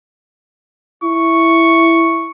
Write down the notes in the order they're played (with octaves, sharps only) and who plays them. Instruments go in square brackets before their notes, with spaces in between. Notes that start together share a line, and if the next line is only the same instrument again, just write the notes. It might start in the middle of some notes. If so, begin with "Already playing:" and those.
[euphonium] E4 [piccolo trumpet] C#6